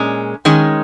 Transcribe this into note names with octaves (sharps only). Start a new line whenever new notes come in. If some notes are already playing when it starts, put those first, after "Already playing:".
Already playing: A#2 G#3 C#4
D#3 G#3 C#4